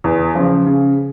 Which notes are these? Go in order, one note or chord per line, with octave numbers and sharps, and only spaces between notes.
E2
C#3 F3
C#3